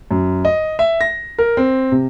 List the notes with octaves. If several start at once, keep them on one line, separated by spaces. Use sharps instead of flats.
F#2
D#5
E5
A#6
A#4
C4
C3